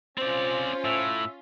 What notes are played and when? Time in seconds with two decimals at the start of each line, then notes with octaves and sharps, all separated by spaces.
0.18 C4 C#4 F4 C5 D5
0.85 A2 E5